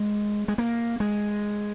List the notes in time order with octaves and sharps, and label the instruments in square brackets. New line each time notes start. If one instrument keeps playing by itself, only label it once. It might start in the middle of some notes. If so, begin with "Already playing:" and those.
Already playing: [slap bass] G#3
G#3
A#3
G#3